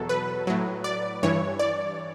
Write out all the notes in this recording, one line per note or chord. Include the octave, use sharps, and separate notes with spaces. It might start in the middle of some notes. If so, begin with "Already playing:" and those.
Already playing: E2 B2 F#3 A4
B4
A2 F#3
D5
G2 E3 C#5
D5